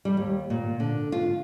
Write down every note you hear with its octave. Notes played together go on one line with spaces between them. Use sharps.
G3
D#2
A#2
D3
F4